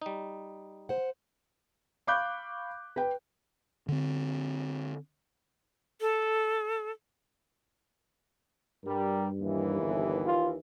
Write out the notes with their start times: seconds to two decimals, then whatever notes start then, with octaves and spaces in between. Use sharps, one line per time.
0.02 G3 D#4
0.89 C5 F#5
2.07 F5 B5 C#6 D6 F#6 G6
2.96 B4 G5
3.88 D3 C4
6.01 A4
8.85 G2 G3 A#4
9.40 D#2 E3
9.81 G1
10.26 F4